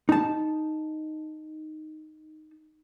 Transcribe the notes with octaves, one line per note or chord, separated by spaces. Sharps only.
D#4 A5